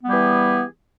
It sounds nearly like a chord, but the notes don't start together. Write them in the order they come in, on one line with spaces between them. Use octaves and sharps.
B3 G3 G4 G#4 E3